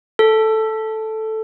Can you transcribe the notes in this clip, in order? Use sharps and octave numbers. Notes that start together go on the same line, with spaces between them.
A4